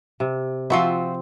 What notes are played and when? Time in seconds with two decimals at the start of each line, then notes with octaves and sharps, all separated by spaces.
0.20 C3
0.70 F3 C4 F4 F#4 E5